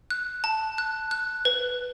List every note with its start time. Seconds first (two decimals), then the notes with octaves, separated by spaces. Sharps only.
0.11 F#6
0.44 A5
0.78 F#6
1.11 F#6
1.45 B4